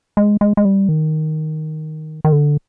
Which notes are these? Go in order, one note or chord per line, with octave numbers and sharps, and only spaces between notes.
G#3
G#3
G#3
G3
D#3
D#3
D3